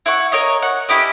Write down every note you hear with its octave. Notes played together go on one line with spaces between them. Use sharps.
E4 F#5 C#6
A#4 C#5 D#5
F#5
C#4 E4 G4 D#5